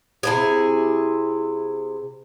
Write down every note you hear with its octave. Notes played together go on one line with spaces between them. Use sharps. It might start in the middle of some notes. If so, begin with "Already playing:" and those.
C3 E4 G#4